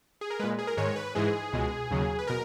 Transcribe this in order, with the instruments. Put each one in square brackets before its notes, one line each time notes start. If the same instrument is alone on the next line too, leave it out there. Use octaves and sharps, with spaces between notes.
[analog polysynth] G#4
A#4
A#2 G#3 B4
G#4
A#4
G#2 D#3 G#3 C#5
B4
G#2 E3 G#3 G#4
C#2 B2 G#3
D#2 C#3 F#3
B4
B2 A#4